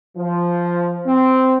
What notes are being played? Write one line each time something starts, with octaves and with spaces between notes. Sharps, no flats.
F3
C4